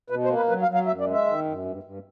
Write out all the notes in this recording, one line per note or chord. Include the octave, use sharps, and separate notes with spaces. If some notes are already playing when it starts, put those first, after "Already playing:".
B2 B4
C5
A#3
B4
F#3 B4
F5
F#3
F5
F#2 E5
D5
G#3
E5
D#3
F#2
G2
G2